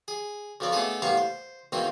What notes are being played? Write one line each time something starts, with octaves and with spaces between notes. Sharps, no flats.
G#4
B1 F2 F3 C4 D5
A3 B3 D4 D#4 G#4 A4
A1 G2 A#3 B3 F5 C#6
C5
E2 B2 D#3 A#3 C4 D#4